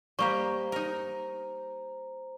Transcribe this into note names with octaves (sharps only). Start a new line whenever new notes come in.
G3 A#3 G4 C5 A#5 C#6
D#4 A#4